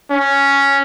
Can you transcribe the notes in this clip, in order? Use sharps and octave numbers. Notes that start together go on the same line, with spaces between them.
C#4